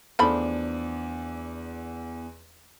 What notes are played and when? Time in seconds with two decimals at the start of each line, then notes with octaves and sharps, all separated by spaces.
0.19 E2 F3 A3 D4 B5